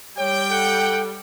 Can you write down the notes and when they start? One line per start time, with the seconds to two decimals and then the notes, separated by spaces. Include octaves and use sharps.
0.18 G3 C#5 G5
0.51 A4 F#5